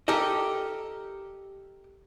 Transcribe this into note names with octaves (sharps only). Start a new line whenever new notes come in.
G4 A4 A#4 D#5